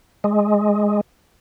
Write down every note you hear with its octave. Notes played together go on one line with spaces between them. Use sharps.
G#3